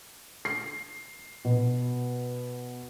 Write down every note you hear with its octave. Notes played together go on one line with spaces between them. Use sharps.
C7
B2